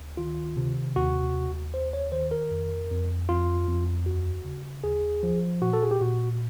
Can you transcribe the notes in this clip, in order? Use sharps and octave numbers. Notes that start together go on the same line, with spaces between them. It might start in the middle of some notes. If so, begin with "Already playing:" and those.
Already playing: D2
D#3 F4
C3
D#2 F#4
D#2
D#2 C5
C#5
D#3 C5
A#4
F2
F2
F2 F4
F2
D#2 F#4
C#3
D#2 G#4
F3
A#2 F#4
A4
G#4
G4
A#2 F#4